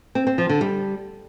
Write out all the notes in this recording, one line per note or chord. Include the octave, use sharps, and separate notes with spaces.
C4
C4
F3
D3
G3